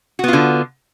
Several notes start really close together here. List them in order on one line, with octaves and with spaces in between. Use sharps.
F#4 B3 F4 D3